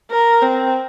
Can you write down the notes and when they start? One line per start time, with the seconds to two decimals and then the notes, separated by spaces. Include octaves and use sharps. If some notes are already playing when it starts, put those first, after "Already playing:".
0.11 A#4
0.42 C4